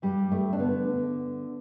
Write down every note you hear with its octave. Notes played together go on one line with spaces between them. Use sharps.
G2 G3
G2 A3
D4
D3 B3
D3